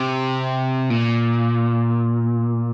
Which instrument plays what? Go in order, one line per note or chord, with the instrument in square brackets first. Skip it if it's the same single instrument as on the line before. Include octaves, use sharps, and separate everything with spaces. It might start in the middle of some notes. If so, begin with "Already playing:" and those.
Already playing: [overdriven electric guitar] C3
A#2